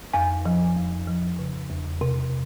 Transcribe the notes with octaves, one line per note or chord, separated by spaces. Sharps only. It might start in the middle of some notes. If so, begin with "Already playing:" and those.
F2 G#5
F3
F2
F3
C#3
E2
C3